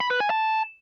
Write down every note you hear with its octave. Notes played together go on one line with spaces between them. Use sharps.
B5
B4
G#5
A5